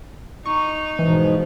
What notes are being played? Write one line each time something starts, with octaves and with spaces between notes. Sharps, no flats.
D#4 C#6
G#2 B2 E3 F3